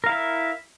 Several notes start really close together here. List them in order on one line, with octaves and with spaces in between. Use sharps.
A#4 F5 E4 E5